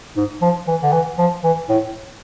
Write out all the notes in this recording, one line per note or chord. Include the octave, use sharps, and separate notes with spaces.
G#2
F3
E3
D3
E3
F3
E3
A2